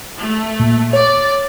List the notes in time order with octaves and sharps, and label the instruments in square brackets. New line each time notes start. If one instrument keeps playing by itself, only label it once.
[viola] A3
[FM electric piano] A#2
[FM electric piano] C#5 [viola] D5